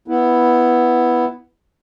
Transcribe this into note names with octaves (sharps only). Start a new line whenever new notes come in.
B3 E4